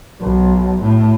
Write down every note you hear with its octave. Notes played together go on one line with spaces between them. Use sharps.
B1
A2